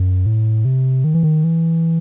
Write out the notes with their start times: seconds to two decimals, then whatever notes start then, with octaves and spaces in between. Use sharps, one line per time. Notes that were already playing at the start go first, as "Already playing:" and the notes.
Already playing: F#2
0.26 A2
0.65 C3
1.04 D#3
1.14 E3
1.23 D#3
1.44 E3